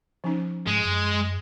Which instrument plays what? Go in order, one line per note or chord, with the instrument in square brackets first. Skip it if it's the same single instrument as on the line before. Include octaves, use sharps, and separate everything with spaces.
[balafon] F3 C#4 D#4
[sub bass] G#2 [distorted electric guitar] G#3
[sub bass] F#2